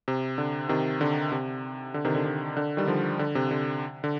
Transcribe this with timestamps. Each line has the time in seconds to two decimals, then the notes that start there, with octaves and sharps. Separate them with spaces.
0.08 C3
0.38 D3
0.69 C3 D#3
1.01 D3
1.32 C3
1.94 D3
2.05 C3 D#3
2.15 D3
2.25 C3
2.57 D3
2.77 D#3 G3
2.87 D3 F3
3.19 D3
3.35 C3
3.51 D3
4.04 D3